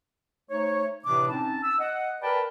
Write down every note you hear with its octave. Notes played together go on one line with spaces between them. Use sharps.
A3 D#4 C5 C#5
A2 C3 E3 B3 D4 D6
C4 C#4 D#4 A5
E6
D#5 F#5
A#4 B4 D5 G5 A5 B5